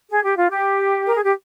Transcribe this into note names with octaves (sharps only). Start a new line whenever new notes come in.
G#4
G4
F4
G4
A#4
G#4
G4